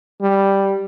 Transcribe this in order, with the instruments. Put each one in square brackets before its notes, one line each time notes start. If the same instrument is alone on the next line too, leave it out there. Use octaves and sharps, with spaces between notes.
[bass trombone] G3